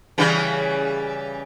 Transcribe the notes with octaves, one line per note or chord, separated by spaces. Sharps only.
C#3 E3 G3